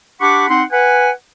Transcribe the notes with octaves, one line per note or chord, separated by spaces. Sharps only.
D4 G4 F#5 B5 C#6 D6
C4 D#4 F#5 C6
B4 F#5 G#5